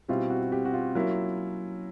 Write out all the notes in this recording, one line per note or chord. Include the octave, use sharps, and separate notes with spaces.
B2 G3 C4 E4 F4
F#4
G4
F#4
F4
F#3 A#3 C#4 E4